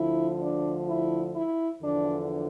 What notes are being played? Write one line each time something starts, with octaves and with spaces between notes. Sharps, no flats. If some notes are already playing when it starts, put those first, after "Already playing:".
Already playing: D2 D3 F3 E4
D4
E4
E4
E2 D3 F3 D4